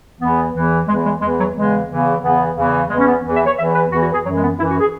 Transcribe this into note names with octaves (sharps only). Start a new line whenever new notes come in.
E2 E3 B3
E2 E3
E2 E3 G#3
G#3
E2 E3 G#3
F#3
E2 C#3 E3 G#3
E2 C#3 E3
E2 C#3 E3 B3
E2 C#3 E3
E2 E3 G#3
C#4
B3
E2 E3
E5
C#5
E2 E3 E5
B4
E2 E3 F#4
F#4
G#4
F#2 E3 F#3
G#3
B3
F#2 E3 E4
F#4
G#4